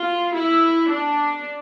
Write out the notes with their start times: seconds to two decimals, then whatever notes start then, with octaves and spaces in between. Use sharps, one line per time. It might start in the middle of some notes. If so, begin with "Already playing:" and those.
Already playing: F4
0.34 E4
0.89 D4